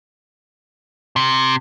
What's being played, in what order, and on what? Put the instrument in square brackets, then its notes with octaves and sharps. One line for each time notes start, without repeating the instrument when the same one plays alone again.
[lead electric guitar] C3